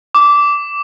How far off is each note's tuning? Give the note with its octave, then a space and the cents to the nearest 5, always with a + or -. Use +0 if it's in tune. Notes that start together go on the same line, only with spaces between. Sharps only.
D6 -15